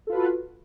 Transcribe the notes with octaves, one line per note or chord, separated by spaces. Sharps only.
F4 F#4 A4 B4